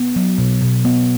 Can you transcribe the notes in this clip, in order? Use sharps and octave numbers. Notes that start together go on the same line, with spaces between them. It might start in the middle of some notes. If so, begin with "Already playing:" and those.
Already playing: B3
F#3
B2
B2
B3